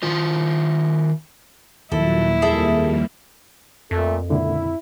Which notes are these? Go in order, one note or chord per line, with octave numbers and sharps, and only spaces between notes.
D#3 F4 C5
D#2 A#2 D#3 F3 F#3 E4 A4
F2 G3 A#3 G#4 A4 E5
F2 A#2 A3
C#2 A#2 D3 E4